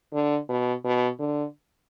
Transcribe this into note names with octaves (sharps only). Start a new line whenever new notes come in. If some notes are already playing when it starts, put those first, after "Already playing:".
D3
B2
B2
D3